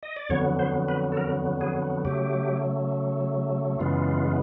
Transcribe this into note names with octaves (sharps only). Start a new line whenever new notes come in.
D#5
D5
F2 D3 F#3 B3 C#5
C5
B4
A4
A#4
G#4
C#3 F#3 A3 G4
F#2 C#3 E3 G#3 B3 F4